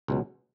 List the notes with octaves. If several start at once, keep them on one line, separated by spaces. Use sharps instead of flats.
C#2 B2 F#3